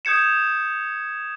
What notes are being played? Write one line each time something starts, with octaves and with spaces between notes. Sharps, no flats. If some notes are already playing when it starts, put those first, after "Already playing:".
D#6 G6 G#6 C#7 E7